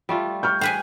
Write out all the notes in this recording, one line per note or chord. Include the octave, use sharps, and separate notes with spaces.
G3 A3 F4
C#6 F6 G6
G#4 B4 C5 G5